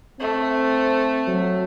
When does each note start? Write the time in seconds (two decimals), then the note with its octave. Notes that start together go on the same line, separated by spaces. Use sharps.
0.20 A3 C4
1.27 F#3